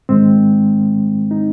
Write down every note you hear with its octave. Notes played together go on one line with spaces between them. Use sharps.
G#2 D#3 G#3 C4
D#4